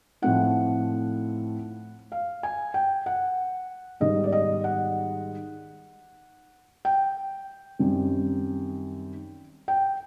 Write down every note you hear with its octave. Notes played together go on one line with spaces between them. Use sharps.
A2 F3 A3 C4 D#4 F#5
F5
G#5
G5
F#5
G#2 D#3 G3 B3 D#5
D5
D#5
F#5
G5
F#2 D#3 G3 C4
G5